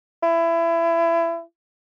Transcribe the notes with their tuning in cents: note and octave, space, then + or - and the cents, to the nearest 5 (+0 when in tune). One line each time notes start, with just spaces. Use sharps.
E4 +25